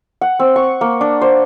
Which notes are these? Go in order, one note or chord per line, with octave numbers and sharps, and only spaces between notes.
F#5
C4
C#6
A#3
D4
C5